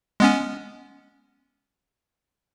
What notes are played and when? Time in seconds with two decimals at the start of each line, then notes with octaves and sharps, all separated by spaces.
0.20 G#3 B3 C#4